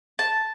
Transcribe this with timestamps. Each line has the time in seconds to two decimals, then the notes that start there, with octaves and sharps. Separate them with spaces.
0.19 A5